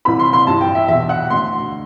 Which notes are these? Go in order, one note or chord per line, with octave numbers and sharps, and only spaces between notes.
C2 C3 E3 B5
C6
C6
G2 E3 A5
G5
E5
E2 B2 E5
F#5
D2 D3 C6